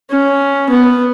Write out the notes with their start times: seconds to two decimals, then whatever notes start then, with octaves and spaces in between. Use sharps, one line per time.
0.11 C#4
0.70 B3